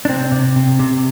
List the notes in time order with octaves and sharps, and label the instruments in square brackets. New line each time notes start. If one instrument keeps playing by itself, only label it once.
[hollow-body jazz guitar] D4
C3 C4
C3
C3
C3